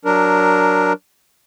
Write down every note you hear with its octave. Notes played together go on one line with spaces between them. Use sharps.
F#3 D4 A#4